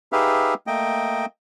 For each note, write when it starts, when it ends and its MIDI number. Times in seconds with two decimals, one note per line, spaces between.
0.12 0.54 63
0.12 0.54 67
0.12 0.54 68
0.12 0.54 71
0.12 0.54 76
0.12 0.54 77
0.67 1.26 57
0.67 1.26 58
0.67 1.26 75
0.67 1.26 79